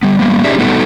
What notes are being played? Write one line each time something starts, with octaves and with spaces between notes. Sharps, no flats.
G3 B3
G3 A#3 B3
C#4 D#4 G4 G#4 D5 E5
G3 A3 B3 D#4 F#4 A4